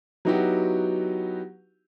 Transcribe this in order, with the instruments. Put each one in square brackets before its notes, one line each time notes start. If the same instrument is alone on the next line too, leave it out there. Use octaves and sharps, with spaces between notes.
[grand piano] F#3 B3 D#4 E4 F#4 G4